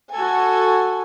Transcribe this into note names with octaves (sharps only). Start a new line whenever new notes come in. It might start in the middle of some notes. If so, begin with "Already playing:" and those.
F#4 A4 G#5